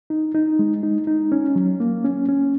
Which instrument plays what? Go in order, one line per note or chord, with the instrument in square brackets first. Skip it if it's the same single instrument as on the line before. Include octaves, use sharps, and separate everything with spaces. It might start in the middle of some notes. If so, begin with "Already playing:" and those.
[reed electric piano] D#4
D#4
G#3
D#4
D#4
C#4
F#3
A#3
C#4
C#4